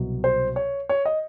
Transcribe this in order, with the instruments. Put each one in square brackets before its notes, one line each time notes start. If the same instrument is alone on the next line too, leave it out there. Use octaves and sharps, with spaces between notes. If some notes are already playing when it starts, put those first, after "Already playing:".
Already playing: [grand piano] C2 B2 F#3
C5
C#5
C#5
D#5